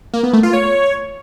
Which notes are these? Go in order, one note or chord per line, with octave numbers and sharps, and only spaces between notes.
A#3
B3
A3
F4
C#5